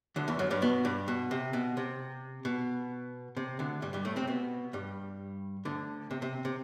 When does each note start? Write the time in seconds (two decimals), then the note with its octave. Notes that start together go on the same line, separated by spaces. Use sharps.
0.16 D2 D3
0.28 E2 E3
0.39 F#2 F#3
0.51 G2 G3
0.62 B2 B3
0.85 G2 G3
1.08 B2
1.31 C3
1.53 B2
1.77 C3
2.45 B2
3.37 C3
3.59 D2 D3
3.82 G2 G3
3.93 G2 G3
4.05 A2 A3
4.16 C3 C4
4.27 B2 B3
4.73 G2 G3
5.65 D2 D3
6.11 C3
6.22 C3
6.45 C3